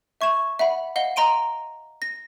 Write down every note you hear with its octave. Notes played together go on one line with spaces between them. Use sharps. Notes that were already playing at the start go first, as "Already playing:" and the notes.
E5 C#6 G#6 E7
E5 F#5 B5
D#5 F5 F#5 G7
D#5 A#5 C6 D7 D#7
A#6